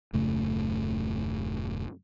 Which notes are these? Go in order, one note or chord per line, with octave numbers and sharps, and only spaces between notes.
D#1 F#2 C#3 A3